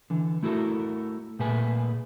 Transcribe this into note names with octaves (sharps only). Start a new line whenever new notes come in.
D3 E3
A3 E4 F#4 A4 A#4
A#2 A3 G#4 B4 G#5